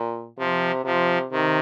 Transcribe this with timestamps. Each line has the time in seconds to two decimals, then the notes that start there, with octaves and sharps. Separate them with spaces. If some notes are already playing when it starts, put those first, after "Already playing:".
Already playing: A#2
0.38 C3 F3
0.84 C3 F3
1.32 C3 D#3